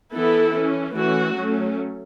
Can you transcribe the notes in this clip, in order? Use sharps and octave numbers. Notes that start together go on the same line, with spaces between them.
E3 B3 E4 A4
E3 C#4
E3 A3 C#4 F#4
F#3 A3 C#4